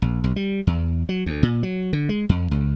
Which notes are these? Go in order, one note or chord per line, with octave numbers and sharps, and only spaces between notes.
A#1
B1
G3
E2
F#3
D2
A#2
F#3
D3
G#3
F2
C#2